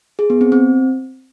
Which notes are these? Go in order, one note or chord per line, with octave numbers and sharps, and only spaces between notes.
G#4
B3
C4
C4